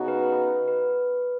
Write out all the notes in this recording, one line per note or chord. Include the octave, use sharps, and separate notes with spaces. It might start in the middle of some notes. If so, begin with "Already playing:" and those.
Already playing: C#3 B3 D#4 F#4
B4
B4